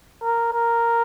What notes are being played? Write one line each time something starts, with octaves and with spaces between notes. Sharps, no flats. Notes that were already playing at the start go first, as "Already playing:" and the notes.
A#4
A#4